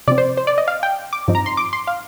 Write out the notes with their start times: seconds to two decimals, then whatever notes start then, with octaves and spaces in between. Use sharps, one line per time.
0.07 C3 F3 C4 D5
0.18 C5
0.37 C5
0.47 D5
0.58 D#5
0.68 F5
0.83 G5
1.13 D6
1.28 G2 F3 C4 D#4
1.35 A#5
1.46 C6
1.57 D6
1.73 C6
1.87 F5